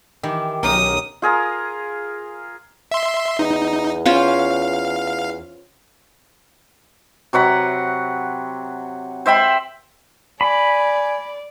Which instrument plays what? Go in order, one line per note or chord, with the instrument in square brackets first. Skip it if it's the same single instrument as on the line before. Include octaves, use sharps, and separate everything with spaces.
[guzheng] D#3 E3 [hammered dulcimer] G4
[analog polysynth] B1 [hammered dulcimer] C#4 A#4 [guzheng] D#4 [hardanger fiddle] D#6
[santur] F4 G#4 A#4 D#6
[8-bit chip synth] E5 C6
[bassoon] E2 [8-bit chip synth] D#4
[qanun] C#4 F4 C5 [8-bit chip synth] F5
[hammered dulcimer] C3 F#3 F#5 B5
C5 E5 G5 B5
[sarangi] D5 [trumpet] G#5 [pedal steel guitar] B5